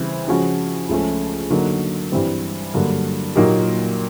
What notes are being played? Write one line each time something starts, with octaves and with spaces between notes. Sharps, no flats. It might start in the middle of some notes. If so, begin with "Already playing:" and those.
Already playing: C#3 E3 G3 C4
C#3 F3 G#3 C#4 F#4
C#2 C#3 F3 A3 C#4
D3 F#3 A#3 D#4
G2 E3 G3 C4
G2 D3 F#3 A#3
A#2 F#3 A#3 D#4 G4